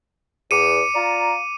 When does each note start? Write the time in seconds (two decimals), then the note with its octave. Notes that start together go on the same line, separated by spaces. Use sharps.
0.51 E2 D6 C#7 D#7
0.95 F4 D5 A#5